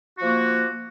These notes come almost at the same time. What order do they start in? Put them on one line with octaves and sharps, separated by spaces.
F#4 F3 A#3